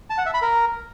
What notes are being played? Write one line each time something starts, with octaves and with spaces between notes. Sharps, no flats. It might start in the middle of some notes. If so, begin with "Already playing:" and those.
A5
F#5
E5
B5
A#4